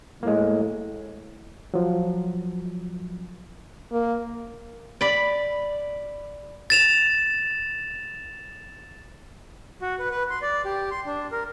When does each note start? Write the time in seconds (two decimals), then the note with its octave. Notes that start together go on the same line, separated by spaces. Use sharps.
0.23 A2 G#3 A#3
1.74 F3 F#3
3.92 A#3
5.01 D5 B5
6.70 A6 E7 F7
9.82 F#4
9.99 B4
10.11 B4
10.30 C6
10.42 D5
10.65 G4
10.91 C6
11.06 D4
11.32 A#4